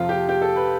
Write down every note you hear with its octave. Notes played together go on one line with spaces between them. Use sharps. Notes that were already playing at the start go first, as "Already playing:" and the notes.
Already playing: F2 C3 F3 F4
G4
G4
A4
B4